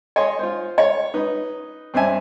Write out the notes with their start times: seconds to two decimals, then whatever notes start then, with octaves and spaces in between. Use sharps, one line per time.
0.16 C#5 D#5 G#5 C6
0.39 F4 C5
0.78 C#5
1.14 D#4 B4
1.94 G2 C4 C#4 E5 G#5